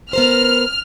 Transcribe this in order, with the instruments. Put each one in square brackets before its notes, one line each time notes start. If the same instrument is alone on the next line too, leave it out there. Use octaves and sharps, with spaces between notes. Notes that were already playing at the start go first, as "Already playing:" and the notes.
[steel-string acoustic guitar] B3 A#4 C5 [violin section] F6